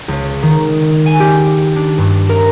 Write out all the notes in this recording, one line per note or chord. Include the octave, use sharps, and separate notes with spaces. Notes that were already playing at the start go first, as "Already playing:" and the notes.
C#2
D#3
G#5
G4
D4
G2
A#4